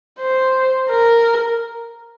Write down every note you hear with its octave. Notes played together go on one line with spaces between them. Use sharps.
C5
A#4